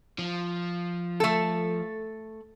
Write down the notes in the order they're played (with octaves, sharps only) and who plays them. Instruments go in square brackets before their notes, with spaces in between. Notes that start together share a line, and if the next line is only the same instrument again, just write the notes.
[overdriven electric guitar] F3
[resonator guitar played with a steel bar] A3 A4